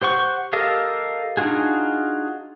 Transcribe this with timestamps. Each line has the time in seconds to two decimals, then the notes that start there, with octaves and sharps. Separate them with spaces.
0.02 G4 C5 F#5 C#6
0.53 G4 A4 A#4 D#5 F5
1.37 D4 D#4 F4 F#4 G#4